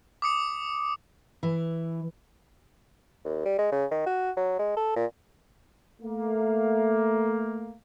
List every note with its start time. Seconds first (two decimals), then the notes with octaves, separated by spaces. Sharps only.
0.22 D6 D#6 C#7
1.43 E3
3.25 D#2
3.45 G3
3.58 G#3
3.71 C#3
3.91 D#3
4.06 F#4
4.36 F#3
4.59 G#3
4.76 A4
4.96 A#2
6.02 A3 A#3